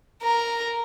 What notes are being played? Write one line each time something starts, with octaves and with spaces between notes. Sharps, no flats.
A#4